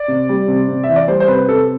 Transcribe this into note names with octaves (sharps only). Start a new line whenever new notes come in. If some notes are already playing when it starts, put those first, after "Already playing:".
Already playing: D5
C3
G3
C3
C3
E3 E5
D5
G3 C5
C5
C3 B4
C3 A4